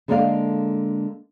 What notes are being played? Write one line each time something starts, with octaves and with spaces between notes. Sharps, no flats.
D3 G#3 A#3 A4 D5 F5